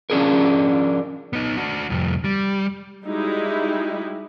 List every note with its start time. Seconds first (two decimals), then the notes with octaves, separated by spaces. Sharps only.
0.10 F3 C#4 D4 G#4 A#4
1.33 B3 D#4
1.57 D4 F#4
1.90 C2 F2
2.25 G3
3.06 G3 G#3 D#4 E4 F#4